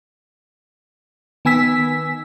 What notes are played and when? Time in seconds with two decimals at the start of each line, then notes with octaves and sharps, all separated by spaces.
1.45 D#3 B3 G#5 E6 B6